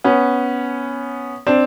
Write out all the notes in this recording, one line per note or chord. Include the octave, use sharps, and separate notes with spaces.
B3 C#4
C4 D4